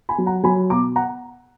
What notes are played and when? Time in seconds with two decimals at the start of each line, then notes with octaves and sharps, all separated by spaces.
0.09 G#5 B5
0.18 F#3
0.26 F#5 A#5
0.44 F#3 G#5 B5
0.70 B2 A#5 D6
0.96 F#5 A#5